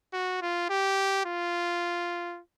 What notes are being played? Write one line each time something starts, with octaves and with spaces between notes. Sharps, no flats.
F#4
F4
G4
F4